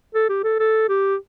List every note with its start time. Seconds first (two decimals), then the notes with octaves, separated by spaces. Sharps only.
0.14 A4
0.29 G4
0.44 A4
0.59 A4
0.89 G4